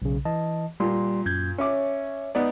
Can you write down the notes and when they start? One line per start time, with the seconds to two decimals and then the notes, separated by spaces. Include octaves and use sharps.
0.02 B1 C#3
0.25 E3 D#5 A5
0.80 A#2 G3 C6
1.26 F#2 G6 G#6
1.58 C#4 C#5 E5 D6
2.35 B3 D#4 D5